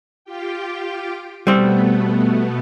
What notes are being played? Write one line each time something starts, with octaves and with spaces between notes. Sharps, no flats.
F4 G4 G5
B2 G3 A3 B3 C4